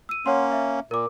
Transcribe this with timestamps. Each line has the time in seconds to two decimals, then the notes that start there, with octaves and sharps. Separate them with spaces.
0.09 E6 D#7
0.26 A#3 C#4 C#5 F#5 C6
0.52 E5
0.91 A#2 A#4 D6